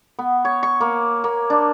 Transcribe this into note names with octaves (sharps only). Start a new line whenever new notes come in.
B3
C#5
C#6
A#3
A#3
D4